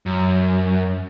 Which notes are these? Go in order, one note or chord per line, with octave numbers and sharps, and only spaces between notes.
F#2